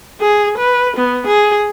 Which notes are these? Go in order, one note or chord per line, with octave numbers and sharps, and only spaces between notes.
G#4
B4
B3
G#4